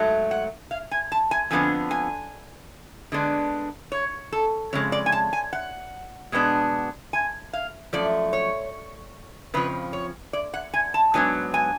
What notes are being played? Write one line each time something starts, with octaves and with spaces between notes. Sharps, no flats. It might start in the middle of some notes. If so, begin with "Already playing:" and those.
Already playing: G#2 F#3 A3
F#5
F5
G#5
A5
G#5
F2 D3 F3 B3 D4 G#5
G#5
D3 G#3 B3 D4
C#5
A4
F2 C#3 G#3 C#5
D5
G#5
A5
G#5
F#5
B2 G#3 B3 D4
G#5
F5
F#2 F3 A3 D5
C#5
F2 C#3 F3 B4
C#5
D5
F#5
G#5
A5
G#2 F#3 B3 D4 G#5
G#5